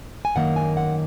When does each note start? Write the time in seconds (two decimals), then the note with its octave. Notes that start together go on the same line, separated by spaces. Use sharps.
0.25 G#5
0.35 F#2 D#3 A#3 F#5
0.56 G#5
0.77 F#5